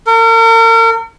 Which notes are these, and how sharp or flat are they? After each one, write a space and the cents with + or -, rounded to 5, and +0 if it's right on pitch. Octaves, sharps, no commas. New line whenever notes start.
A#4 -40